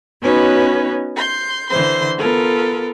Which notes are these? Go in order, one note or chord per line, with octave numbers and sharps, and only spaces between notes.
B3 C#4 D#4 F#4 B4 C#5
C6 G6
D3 E3 C5 C6
B3 F4 A4 A#4